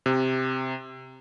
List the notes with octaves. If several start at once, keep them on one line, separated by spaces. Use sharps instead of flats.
C3